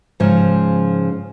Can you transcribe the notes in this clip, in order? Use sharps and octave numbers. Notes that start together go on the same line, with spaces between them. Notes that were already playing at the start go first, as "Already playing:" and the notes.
G#2 C#3 F3